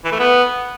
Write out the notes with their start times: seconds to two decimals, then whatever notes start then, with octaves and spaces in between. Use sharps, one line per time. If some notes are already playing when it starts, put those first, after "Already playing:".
0.04 E3
0.12 A3
0.19 B3